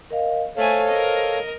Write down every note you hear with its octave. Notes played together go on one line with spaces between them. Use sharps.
A#4 D#5 F5
A3 A4 C5 C#5 F5 G#5
A#4 D#5